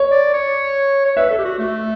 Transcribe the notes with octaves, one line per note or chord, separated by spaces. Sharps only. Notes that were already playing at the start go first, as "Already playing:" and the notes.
Already playing: C#5
D5
C#5
C#5
B4 E5
A4
G4
F#4
A3